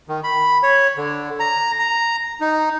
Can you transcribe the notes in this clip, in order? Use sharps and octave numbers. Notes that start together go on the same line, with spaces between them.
D#3
B5
C#5
D3
A#5
A#5
D#4